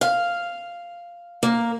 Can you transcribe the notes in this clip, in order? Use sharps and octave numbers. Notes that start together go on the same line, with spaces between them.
F5
A#3